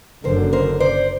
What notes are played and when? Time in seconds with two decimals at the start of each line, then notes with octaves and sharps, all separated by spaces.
0.24 F#1 F#2 D3 A#4 C5
0.53 A#4 C5
0.80 C5 D5